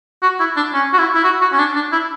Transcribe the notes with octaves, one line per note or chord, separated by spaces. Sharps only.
F#4
E4
D4
C#4
F#4
E4
E4
F#4
F#4
C#4
D4
D4
E4